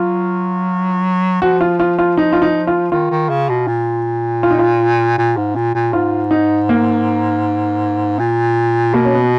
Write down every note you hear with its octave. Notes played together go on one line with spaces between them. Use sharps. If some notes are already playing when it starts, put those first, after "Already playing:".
Already playing: F#3 F4
F3 F#4
F4
F4
F4
D#4
F4
D#4
F4
D#3 F4
D#3
C#3
B2
A#2
F4
D#4
F4
A#2
G#2
A#2
A#2
G#2 F4
D#4
A#3
A#2
B2 A#3
C#4
B3